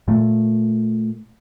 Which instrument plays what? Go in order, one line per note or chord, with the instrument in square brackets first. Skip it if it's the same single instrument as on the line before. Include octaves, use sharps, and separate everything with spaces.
[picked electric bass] A#2 A3